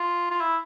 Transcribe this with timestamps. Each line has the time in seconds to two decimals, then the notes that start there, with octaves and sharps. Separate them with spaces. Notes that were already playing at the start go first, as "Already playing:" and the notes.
Already playing: F4
0.31 F4
0.41 E4